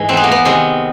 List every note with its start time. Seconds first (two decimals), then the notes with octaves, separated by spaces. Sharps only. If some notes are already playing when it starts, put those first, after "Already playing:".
Already playing: G#2 E3 G#3
0.09 E2 C4
0.17 B3
0.24 A#3
0.32 B3
0.45 C3 D#3 G#3